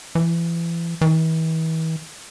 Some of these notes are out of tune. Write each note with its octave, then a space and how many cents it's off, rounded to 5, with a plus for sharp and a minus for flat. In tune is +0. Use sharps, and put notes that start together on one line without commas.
E3 +35
E3 -40